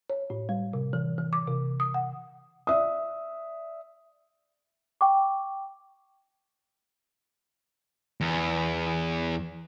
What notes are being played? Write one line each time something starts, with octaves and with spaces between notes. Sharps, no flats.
C#5
A2
G3
C3
E3
E3
D6
C3
D#6
F#5
D5 E5 D#6
G5 C#6 D6
E2